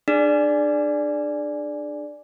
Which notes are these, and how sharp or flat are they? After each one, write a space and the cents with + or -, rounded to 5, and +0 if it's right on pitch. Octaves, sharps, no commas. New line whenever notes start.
D4 +30 G#4 +0 D5 +0